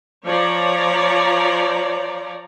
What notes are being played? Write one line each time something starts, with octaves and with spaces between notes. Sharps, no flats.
F3 C#5 D5 A#5